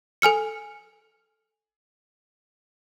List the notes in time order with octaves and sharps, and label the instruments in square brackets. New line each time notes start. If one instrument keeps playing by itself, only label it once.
[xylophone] A4 G#5 F6 C#7